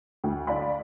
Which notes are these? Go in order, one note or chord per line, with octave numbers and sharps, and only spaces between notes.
D2
D5 F5 B5